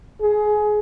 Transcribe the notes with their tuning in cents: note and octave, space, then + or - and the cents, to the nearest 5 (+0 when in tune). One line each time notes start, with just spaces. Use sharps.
G#4 +20